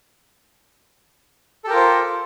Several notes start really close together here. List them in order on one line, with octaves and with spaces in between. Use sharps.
A4 G4 A#4 F4 C5